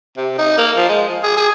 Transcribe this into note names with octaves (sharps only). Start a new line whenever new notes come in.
C3
D#4
A#3
F3
G#3
F3
G#4
G#4